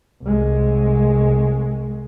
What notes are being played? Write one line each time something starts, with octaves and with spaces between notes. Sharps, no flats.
C2 G#3